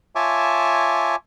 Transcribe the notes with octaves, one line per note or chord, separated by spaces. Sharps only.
F4 C#5 E5 G#5 A5 D6